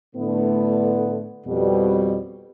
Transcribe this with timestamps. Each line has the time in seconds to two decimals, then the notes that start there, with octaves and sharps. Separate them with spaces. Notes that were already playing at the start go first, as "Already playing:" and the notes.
0.16 A2 D3 A3 B3
1.47 F2 B2 G3